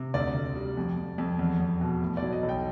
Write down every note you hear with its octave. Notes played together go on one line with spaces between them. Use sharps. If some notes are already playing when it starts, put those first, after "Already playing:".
Already playing: C3
D2 D5
D2
G3
F2
F2
F2
E2
E2
B2
A2
D5
F#3
D#5
B1
G5